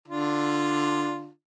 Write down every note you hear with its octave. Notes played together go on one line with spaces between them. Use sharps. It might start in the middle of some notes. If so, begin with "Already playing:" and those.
D3 D4 F4